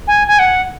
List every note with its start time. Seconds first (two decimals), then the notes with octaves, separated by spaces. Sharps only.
0.08 G#5
0.28 G#5
0.39 F#5